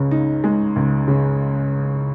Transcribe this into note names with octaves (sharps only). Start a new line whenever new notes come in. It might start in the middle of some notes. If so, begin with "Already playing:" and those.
Already playing: C#2 C#3
D#4
G#3
C#2
C#3